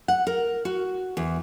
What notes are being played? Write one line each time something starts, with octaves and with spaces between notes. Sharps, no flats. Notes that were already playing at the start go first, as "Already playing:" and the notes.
F#5
A#4
F#4
E2